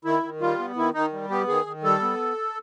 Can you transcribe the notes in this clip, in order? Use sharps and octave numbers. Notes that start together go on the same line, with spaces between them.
D#3 E4
D#3
G3 F4
B3
D#3 E4
D#3 D#4
G3
B3 G4
D#3 G#4
D#3
G3 A4
B3